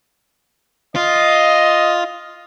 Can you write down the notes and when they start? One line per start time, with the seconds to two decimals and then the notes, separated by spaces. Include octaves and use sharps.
0.96 F4 D#5